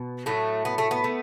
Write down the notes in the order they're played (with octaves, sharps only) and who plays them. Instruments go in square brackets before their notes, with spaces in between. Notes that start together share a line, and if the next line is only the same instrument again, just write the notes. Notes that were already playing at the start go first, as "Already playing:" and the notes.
Already playing: [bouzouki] B2
A2 F#3 A3
B3
A3
B3
A3